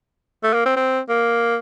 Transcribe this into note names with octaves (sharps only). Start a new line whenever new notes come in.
A3
A#3
C4
C4
A#3